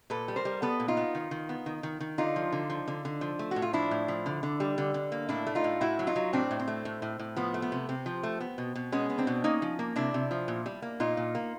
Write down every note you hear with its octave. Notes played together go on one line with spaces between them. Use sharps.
A#2 A4 B4
G3
A#4 C5
G3
B3 A4 B4
A#2
D#4 F4
B3
D#3
D#3
B3
D#3
D#3
D#3
D3 D#4 F4
F3
D3
F3
D3
D3
F3
A3
A2 F#4
F4
F3 D4 E4
A2
F3
D3
D3
G3
D3
D3
A#3
A2 D4 E4
A3
D#4 F4
A2
A2 E4 F#4
F#3
D#4 F4
F#3
A2 C4 D4
A2
C4
A3
A2
A2
A2
F3 B3
A3
B3
C3
C3 C4
F3
A3
B3
B2
B2
G#3 B3 C#4
B3
C4 D4
B2
A#3 C#4 D#4
F3
A#3
C3 D4 E4
C3
F3
A#2
G3
A#3
A#2 D#4 F4
A#2
A#3